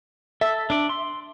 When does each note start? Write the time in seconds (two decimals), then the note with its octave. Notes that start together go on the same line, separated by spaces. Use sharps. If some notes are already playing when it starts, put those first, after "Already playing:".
0.41 A4 E5
0.70 D4 D5
0.89 C6